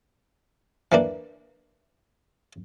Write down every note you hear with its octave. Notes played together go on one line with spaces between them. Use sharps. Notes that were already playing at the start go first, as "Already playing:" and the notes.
E3 A#3 D4